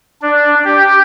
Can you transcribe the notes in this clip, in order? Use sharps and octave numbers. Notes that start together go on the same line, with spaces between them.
D4
G4